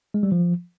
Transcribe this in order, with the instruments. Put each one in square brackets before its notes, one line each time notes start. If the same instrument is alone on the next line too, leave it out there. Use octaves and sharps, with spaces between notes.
[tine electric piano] G#3
G3
F3